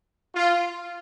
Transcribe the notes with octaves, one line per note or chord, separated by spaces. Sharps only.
F4